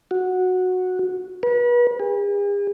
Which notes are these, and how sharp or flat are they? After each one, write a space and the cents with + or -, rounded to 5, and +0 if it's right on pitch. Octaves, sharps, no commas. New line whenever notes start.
F#4 -10
B4 -35
G#4 -45